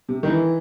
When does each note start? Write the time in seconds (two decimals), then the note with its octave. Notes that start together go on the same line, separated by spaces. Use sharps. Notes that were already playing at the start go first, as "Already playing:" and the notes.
0.09 C3
0.23 D#3
0.28 E3